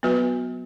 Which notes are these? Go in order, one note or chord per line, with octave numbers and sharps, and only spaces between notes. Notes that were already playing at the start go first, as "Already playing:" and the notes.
F#3 B3 F#4 B4